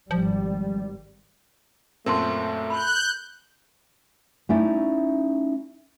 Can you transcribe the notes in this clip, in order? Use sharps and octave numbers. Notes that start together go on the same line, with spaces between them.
G#1 F3 G3
F#2 A#2 A3 C4 A#4 A5 C6
B5 F#6 G6
A3 C#4 D#4 E4 D5